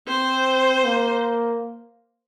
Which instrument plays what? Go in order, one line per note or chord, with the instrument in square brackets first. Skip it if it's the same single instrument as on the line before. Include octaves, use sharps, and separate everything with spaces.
[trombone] C4 [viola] C5
[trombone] A#3